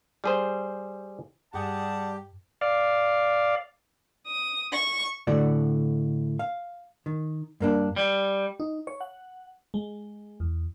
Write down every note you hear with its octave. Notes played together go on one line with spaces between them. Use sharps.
G3 G#4 C5
G2 G3 G4 G#4 F#5 A5
D5 F5
D#6
C#6
A2 D3 A3 F#4 D5
F5
D#3
G2 A#3 D4
G3
D#4
C#5
F#5
G#3
E2